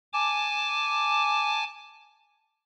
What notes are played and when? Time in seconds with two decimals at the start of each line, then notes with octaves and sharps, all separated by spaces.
0.13 G#5 A5 D6